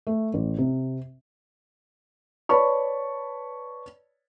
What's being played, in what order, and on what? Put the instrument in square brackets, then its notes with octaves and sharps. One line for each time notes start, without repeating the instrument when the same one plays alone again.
[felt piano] A3
A1
C3
B4 C#5 D5 A5 B5 C#6